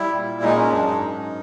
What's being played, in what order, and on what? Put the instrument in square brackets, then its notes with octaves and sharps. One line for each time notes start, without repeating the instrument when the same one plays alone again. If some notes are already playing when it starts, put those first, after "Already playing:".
Already playing: [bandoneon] G3 E4
A#2
G#3 D#4
C#4
F#2 D4
D#4
G#2